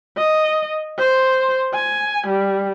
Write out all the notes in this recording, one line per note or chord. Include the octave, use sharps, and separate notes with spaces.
D#5
C5
G#5
G3